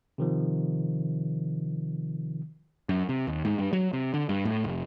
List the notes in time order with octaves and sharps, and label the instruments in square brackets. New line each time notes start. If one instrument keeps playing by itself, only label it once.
[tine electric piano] C3 D#3 F3
[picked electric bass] F#2
C3
D#2
G#2
G2
F#3
C3
D3
G2
A2
F1